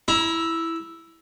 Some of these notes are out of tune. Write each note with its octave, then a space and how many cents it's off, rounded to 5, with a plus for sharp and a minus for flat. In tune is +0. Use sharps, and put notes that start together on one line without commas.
E4 +0 A#5 +30